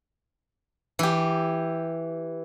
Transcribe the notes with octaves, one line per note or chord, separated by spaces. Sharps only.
E3 G4